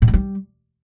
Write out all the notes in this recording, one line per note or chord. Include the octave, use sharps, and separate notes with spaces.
A2
G#3
G3